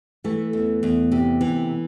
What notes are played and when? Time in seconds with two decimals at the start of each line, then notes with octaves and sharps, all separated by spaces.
0.24 E3 A3
0.53 E2
0.83 E2
1.12 C3
1.41 E3